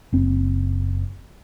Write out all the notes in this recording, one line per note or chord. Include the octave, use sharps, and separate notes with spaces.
F#1 C4